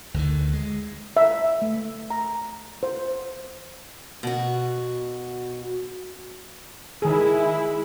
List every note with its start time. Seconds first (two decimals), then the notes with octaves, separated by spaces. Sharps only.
0.14 D2 D3 D#3
0.53 G#3
1.17 E5
1.62 A3
2.10 A#5
2.83 C5
4.23 B2 F#4
7.02 D#3 G#3 E4 G#4